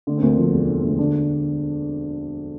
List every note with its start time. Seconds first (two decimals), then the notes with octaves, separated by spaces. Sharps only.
0.07 D3 A3
0.18 C4
0.22 D2 A#3
0.38 F3
0.53 E1
0.68 D3
0.84 D2
0.98 D3 D4